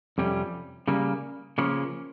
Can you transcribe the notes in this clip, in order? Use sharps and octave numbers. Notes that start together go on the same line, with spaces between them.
F2 C3 G3 C#4
C#3 G3 A#3
C#3 F3 A#3 C#4